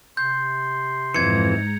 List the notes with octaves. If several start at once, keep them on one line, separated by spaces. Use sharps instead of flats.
C3 C6 G6
F2 G#2 E3 A#5 G#6 C#7